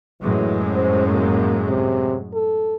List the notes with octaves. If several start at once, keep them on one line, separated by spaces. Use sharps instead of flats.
F#2 A2 E3 G#3
C5
A#3
C3
A4